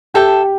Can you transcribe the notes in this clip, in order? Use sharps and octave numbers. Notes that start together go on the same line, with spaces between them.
G4 A4 E5 G5